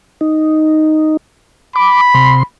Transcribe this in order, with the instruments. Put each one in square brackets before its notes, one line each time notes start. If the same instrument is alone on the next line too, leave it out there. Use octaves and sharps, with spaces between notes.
[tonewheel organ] D#4
[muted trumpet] B5 [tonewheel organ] D6
[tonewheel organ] C3 C6